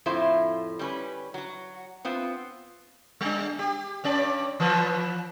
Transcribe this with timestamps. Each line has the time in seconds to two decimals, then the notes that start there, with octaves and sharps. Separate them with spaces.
0.06 F2 A2 E4 F4 C5
0.79 G3 C#4 B4
1.34 F#3 F#4
2.05 B3 C4 F4
3.21 G3 D4
3.59 G4
4.04 G2 C#4 D5
4.60 E3 F3 B4